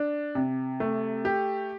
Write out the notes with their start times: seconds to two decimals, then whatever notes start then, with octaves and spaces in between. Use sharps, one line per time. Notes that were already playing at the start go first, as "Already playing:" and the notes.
Already playing: D4
0.35 C3
0.80 A3
1.25 G4